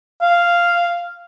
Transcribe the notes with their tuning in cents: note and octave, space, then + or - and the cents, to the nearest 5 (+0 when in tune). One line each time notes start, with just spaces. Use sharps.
F5 -5